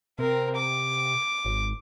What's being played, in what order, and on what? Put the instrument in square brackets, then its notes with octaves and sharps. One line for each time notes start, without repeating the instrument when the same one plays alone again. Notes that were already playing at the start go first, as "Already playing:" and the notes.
[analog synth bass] C3 [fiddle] C4 A#4
[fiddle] D6
[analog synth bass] G#1